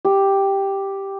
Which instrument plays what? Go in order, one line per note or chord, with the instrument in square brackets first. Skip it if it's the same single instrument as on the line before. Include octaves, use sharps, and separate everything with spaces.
[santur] G4